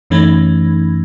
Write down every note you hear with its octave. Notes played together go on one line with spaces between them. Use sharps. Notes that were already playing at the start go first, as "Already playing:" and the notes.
F#2 E3 A3 C#4 D#4